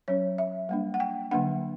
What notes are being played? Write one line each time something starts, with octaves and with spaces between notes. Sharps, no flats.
F#3 C#4 C#5
E5
G3 A#3 D4
F#5
G5
D3 F#3 A#3 D4 F#5